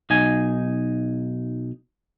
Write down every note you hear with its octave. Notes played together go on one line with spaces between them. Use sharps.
B1 D#4 G#5